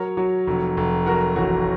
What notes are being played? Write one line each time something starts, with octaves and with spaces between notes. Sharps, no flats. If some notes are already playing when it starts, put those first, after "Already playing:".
Already playing: F#3 A#4 C#5
F#3
F1
F1
F#3 F#4 A#4
A1 F#4